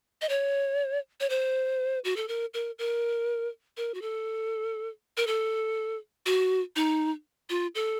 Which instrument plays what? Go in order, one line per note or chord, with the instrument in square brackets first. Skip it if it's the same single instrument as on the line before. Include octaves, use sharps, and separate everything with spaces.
[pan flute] D#5
C#5
C#5
C5
F#4
A4
A#4
A#4
A#4
A#4
F#4
A4
A#4
A4
F#4
D#4
F4
A4